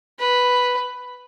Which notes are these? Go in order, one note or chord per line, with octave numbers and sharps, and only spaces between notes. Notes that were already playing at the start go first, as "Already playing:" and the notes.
B4